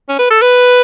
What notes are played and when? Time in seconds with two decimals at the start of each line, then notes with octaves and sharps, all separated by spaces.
0.09 C#4
0.19 B4
0.31 A4
0.42 B4